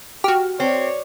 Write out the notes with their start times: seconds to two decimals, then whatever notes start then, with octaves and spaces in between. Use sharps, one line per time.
0.24 F#4 G4 F6
0.60 C4 C#5 D5